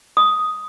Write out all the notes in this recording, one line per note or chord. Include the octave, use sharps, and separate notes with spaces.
D#6